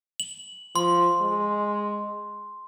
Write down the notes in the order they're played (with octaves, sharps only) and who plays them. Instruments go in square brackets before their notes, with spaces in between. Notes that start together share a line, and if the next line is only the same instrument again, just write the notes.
[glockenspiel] F#7
[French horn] F3 [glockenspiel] C6
[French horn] G#3